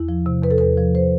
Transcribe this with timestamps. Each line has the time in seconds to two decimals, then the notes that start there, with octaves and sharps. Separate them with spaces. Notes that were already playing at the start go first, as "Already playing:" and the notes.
Already playing: E2 E4
0.09 F3
0.26 C3
0.43 E2 B4
0.51 A4
0.58 E2 B4
0.78 F3
0.95 C5